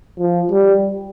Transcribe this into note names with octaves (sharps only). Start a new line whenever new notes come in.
F3
G3